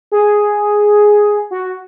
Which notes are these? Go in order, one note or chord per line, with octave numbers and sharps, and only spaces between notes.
G#4
F#4